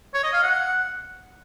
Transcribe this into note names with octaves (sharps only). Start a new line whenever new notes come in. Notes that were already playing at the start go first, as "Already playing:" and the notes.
C#5
D#5
F5
F#5